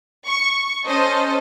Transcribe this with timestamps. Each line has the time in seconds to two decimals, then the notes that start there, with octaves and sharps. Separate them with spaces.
0.28 C#6
0.86 C#4 A4 C5 D#5